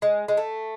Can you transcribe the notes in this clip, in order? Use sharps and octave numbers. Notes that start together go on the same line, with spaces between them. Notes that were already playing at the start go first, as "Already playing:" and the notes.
G#3
G#3
A3